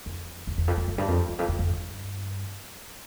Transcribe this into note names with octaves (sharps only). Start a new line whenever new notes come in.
F2
E2
E2
F2
F2
F2
G2
F2
E2
F2
E2
F2
G2